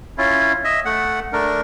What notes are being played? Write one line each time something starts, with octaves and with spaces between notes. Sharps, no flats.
C#4 E4 F4
D#5 E5
A3 F#5
A3 D4 A#4